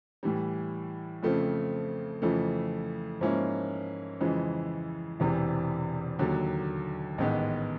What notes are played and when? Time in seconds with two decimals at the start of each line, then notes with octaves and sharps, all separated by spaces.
0.23 A2 E3 G3
1.23 F2 C#3 F3 A3 C4
2.22 F2 C#3 E3 A3
3.21 G#2 F3 A#3 C#4 E4
4.21 F2 C#3 E3 G#3
5.20 E1 E2 C3 E3
6.19 D#2 D3 F#3
7.18 A1 G#2 D#3 G#3 B3